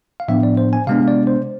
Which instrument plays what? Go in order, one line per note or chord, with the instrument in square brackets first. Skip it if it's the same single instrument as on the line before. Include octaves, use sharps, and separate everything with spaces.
[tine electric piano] F5
A2 F3 B3 D4 E5
D5
C5
G#5
C3 G#3 B3 D4 F5
D5
C5